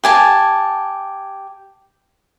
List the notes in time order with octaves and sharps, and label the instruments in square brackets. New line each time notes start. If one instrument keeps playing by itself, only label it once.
[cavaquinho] G4 G#5 A5